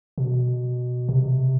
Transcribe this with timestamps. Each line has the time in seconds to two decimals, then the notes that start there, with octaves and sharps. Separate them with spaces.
0.18 B2
1.08 C3